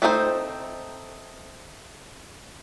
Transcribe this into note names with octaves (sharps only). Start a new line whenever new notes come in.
A3 C4 D#4 G#4 C5